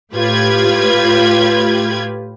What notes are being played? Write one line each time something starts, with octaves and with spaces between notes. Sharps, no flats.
A2 F4 G4 B4 G#6